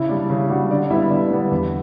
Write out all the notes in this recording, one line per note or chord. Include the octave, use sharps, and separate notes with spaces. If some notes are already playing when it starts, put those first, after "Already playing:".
Already playing: C#3 E4 E5
G3 D4
C#3
G3 D4 F#4 F#5
D3 D5
G3 B3 D4 E4 E5
D3 D5
G3 B3 D4
E2